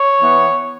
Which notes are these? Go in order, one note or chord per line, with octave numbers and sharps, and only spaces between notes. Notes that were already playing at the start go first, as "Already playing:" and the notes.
Already playing: C#5
E3 B3